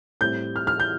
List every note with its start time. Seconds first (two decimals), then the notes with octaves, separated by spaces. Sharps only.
0.21 A2 G3 C4 G6
0.56 F6
0.67 F6
0.80 G6